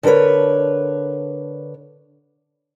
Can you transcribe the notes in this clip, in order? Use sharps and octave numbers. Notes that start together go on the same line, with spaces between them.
D3 D4 A#4 B4 C#5